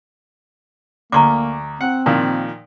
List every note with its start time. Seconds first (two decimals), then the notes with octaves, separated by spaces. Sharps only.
1.12 D2 A#3 A#5 C#6 D6
1.81 C4 F#5
2.06 A#2 D#3 F3